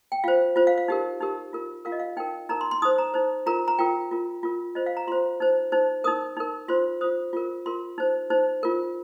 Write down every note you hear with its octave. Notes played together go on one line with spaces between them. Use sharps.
G5
F4 C5 F5
F4 C5
F5
F5
D#4 G4 A#4
D#4 G4 A#4
F4 A#4
F4 A#4 F5
D#5
F5
D#4 A#4 G5
D#4 A#4 A#5
C6
C6
D#4 C5 D#6
A#5
D#4 C5
F4 A#4 A#5
A#5
F4 A#4 G5
F4 A#4
F4 A#4
F4 C5 D#5
F5
A#5
F4 C5 C6
D#4 C5
D#4 C5
D#4 A#4 D#6
D#4 A#4
F4 C5 C6
F4 C5 D#6
F4 A#4
F4 A#4 C6
D#4 C5
D#4 C5
F4 A#4